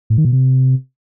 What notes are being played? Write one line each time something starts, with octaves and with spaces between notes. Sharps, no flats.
A2
D#3
B2
C3